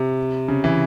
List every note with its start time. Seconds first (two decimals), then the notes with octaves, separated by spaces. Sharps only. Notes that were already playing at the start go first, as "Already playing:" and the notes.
Already playing: C3
0.48 C#3
0.64 E3